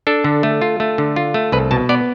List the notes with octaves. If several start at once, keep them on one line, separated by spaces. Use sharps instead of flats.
D4 A4
D3
A3
F4
A3
D3
F4
A3
C2 B4
B2 A5
B3 D5